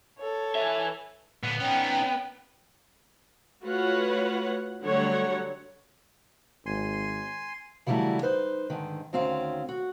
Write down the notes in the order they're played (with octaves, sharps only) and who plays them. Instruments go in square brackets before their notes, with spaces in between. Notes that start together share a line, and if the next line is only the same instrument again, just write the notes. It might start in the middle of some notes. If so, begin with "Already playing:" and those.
[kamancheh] A4 C#5
[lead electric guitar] E3 E5
[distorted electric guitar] A#2 D3 [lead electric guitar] B3
[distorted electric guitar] C#4 D#4 [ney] G5
[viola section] A3 F4 F#4 B4 C#5 F#5
D3 F#3 G3 A3 C#5 F#5
[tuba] G#1 [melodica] G#5 C6
[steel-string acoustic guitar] C#3 E3 F#3 G3 A3 E4
D#4 B4 C5
G#2 D3 D#3
D2 D#3 C4 C#4 F5
F#4